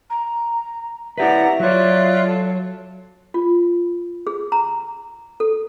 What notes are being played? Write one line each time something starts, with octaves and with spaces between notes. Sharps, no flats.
A#5
E4 G4 B4 D5 E5 F#5 A#5
F#3 F4 C#5 D5 F#6
A4
F4
G#4
A#5
A4